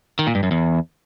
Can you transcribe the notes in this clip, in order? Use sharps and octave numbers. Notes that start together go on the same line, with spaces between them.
D#3
A#2
G2
F#2
E2